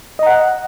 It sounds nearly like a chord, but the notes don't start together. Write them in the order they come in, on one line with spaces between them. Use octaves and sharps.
D#5 A#5 F#5